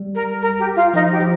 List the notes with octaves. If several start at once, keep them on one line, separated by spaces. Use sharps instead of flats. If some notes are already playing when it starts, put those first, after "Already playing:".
Already playing: G3
A#4
A#4
G4
F4
F3 D#4
G4
F3